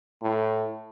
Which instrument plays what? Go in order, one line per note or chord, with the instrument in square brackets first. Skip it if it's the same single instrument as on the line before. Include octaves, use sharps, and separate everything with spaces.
[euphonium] A2